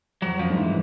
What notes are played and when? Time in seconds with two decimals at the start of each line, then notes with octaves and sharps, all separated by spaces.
0.22 F2 F#3
0.39 F#2 F3
0.50 G#2
0.57 G2 E3